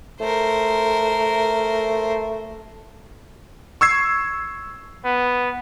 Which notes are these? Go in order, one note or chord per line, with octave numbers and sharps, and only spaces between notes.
A3 A#4 C5
C#6 E6 G#6 C7
B3